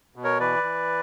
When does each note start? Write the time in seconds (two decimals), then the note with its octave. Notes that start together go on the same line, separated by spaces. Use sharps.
0.16 B2
0.24 A#4 C#5
0.40 E3 B4 D5
0.63 E3